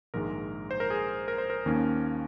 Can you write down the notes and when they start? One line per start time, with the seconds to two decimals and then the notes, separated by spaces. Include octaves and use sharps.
0.14 A#1 G#2 D#3 G#3 A#4
0.71 C5
0.80 A#4
0.90 G#4
1.28 A#4
1.38 C5
1.50 A#4
1.66 D#2 D#3 A#3 C#4